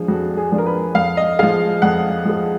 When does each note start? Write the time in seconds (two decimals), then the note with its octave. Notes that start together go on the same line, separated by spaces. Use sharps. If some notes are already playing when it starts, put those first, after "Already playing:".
Already playing: F3 G#3 D4
0.08 F2 F#4
0.37 G#4
0.52 F3 G#3 D4
0.58 A#4
0.66 B4
0.95 F2 F5
1.17 D#5
1.39 F3 G#3 F5
1.82 F2 F#5
2.25 F3 G#3